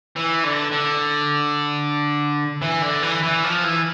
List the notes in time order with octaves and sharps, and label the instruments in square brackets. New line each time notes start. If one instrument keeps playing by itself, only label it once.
[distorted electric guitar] E3
D3
D3
E3
D3
E3
E3
F3
E3